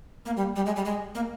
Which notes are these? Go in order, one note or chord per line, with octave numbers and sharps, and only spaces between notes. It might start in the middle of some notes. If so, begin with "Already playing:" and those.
A#3
G3
G3
G#3
G3
G#3
A#3